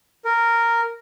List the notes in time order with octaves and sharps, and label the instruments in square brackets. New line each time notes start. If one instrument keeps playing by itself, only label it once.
[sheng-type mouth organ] A#4